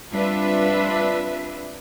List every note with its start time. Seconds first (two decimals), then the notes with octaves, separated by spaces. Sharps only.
0.11 G3 C4 D4 F4 B4 E5